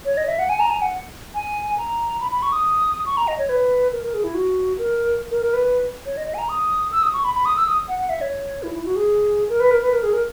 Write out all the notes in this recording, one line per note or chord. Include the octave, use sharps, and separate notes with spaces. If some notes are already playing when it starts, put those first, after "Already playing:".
C#5
D#5
E5
F#5
G#5
A#5
G#5
F#5
G#5
A#5
B5
B5
C#6
D#6
C#6
A#5
D#5
C#5
B4
A#4
A#4
G#4
E4
F#4
A#4
A#4
A#4
B4
C#5
D#5
D#5
G#5
A#5
D#6
E6
D#6
C#6
B5
B5
D#6
E6
D#6
F#5
F#5
E5
C#5
E4
E4
F#4
G#4
A#4
B4
A#4
B4
A#4
G#4
A#4